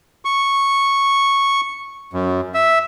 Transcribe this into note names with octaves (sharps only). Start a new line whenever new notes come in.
C#6
F#2
E5